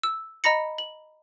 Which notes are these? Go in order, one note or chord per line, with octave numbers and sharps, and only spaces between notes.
E6
D#5 A#5 B5 A#6 C#7
F#7